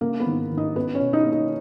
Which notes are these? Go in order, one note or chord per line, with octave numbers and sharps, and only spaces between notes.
C#3 A#3 A#4
B3 B4
G#1
G#1
D#4 D#5
B3 C#4 B4
C#4 C#5
B2
D#4 D#5
A#3
D#4 D#5